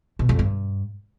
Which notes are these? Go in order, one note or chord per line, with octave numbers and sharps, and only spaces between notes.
B2
F2
G2